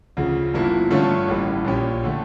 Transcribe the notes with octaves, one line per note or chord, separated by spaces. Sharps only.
D2 C#3 F3
G1 G2 F3 A#3 E4
G2 D3 A3 C#4 F4
A1 A2 G3 A#3
A#1 A#2 F3 C#4 G4
D3 A3